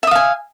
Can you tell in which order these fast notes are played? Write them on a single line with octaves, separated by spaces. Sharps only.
E5 D#6 F5 G#5